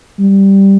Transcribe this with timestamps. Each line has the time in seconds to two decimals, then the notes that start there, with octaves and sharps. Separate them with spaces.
0.20 G3